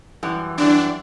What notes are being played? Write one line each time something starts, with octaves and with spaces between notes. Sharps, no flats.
F#2 E3 G3
F#2 E3 G3 D4